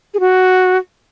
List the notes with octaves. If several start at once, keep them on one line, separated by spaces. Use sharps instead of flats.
G#4
F#4